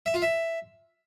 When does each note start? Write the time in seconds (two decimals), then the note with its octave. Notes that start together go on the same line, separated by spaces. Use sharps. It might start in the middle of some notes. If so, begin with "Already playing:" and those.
0.06 E5
0.14 F4
0.22 E5